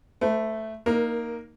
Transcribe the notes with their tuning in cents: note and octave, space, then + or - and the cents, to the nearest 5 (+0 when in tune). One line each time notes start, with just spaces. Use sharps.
A3 +0 C5 -45
A#3 +0 D#4 +0 A#4 +25